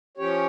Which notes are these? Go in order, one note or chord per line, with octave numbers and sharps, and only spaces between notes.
F3 C#4 G4 C#5